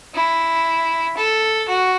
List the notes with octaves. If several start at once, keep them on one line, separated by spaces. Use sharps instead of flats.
E4
A4
F#4